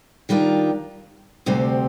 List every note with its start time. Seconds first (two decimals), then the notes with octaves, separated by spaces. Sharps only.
0.29 D#3 G3 D4 F4 A#4
1.46 D2 C3 G3 C4